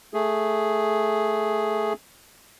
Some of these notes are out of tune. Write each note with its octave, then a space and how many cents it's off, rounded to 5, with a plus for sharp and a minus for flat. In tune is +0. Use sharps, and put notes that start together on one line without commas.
A3 +0 G#4 +0